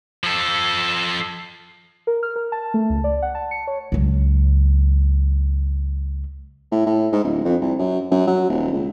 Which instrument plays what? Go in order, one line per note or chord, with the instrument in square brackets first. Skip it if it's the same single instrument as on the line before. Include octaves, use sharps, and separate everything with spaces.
[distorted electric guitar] F3 A4
[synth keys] A#4
F6
A#4
A5
A3
C#2
D5
F#5
A5
C#7
C#5
[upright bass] C#2 F#3
[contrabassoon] A2
A2
G#2
D1
F2
C2
F#2
F#2
F#3
D#1
C#2